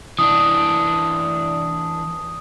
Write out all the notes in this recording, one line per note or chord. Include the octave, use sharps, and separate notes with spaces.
E3 D4 D#6